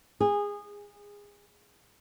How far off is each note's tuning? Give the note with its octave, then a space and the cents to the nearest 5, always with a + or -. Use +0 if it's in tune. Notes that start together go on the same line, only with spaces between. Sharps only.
G#4 -20